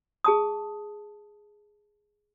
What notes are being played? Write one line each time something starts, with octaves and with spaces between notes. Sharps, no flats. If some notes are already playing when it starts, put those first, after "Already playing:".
G#4 A5 D#6